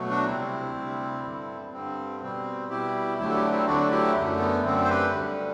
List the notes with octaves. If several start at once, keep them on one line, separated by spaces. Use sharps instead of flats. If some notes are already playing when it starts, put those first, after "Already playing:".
Already playing: B2 F#3 A3
D4 F#4
D2 C3 G3 C4 E4
D2 C3 G3
G2 D3 G3
G2 D3 G3 C4
B2 G3 C4
B2 G3 E4 G4
D2 D3 F#3 A3 E4 G4
A4
E4 G4
C4 E4
D2 D3 F#3 A3 D4 F#4
E4 G4
F#2 D3 A3
B3
F#2 D3 A3 C4
C5
G4 B4
D2 D3 G3